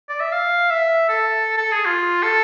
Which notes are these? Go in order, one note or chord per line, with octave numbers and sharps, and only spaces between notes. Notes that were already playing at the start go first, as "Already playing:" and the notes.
D5
E5
F5
E5
A4
A4
G#4
F4
A4